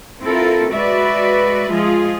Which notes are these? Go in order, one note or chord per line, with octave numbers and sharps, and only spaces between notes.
C4 E4 F4 A4 A#4
G#3 F#4 B4 D5 E5
F3 G#3 F4 G#4